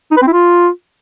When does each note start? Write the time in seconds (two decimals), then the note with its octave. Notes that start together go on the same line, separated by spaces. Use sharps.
0.11 D#4
0.17 B4
0.22 C4
0.27 E4
0.33 F4